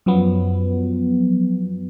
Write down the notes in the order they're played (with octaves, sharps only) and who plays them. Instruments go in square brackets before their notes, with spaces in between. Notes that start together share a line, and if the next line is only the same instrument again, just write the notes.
[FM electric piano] F#2 F3 F#3 B3